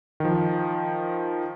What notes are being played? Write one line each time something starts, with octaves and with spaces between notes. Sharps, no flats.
D#3 F3